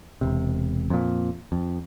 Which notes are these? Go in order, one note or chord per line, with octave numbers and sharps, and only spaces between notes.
E1 C3
F2 A#2
F2